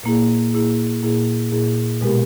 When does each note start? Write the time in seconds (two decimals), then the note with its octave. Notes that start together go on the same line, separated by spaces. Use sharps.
0.03 A#2 A#3 E4 G#4
0.53 A#2 A#3 E4 G#4
1.03 A#2 A#3 E4 G#4
1.52 A#2 A#3 E4 G#4
2.01 B2 G#3 B3 G4 A#4